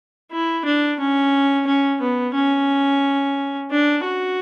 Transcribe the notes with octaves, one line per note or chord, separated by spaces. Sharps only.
E4
D4
C#4
C#4
B3
C#4
D4
F#4